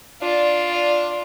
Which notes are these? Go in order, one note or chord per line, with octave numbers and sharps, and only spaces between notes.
D4 F4 D5